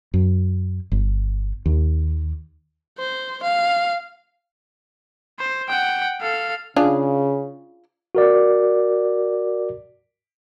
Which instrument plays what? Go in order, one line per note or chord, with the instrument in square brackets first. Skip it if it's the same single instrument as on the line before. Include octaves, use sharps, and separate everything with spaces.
[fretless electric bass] F#2
G1
D#2
[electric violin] C5
F5
C5
F#5 G5
A4 F5
[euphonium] C#3 [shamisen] D4 F4 G#4
[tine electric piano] F#4 A#4 D5